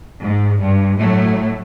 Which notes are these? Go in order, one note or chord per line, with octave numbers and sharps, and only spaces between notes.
G#2
G2
A2 F#3 A3